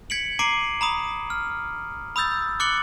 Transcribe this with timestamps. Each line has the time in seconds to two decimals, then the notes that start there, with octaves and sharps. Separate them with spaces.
0.10 G#6 B6 C#7 D7 F#7
0.39 A#5 D6 C7 D7 D#7 F#7
0.81 A#5 B5 D#6
1.30 F6
2.16 B5 D#6 E6 G6 A6
2.60 D6 F#6 A6 C#7 F#7 G7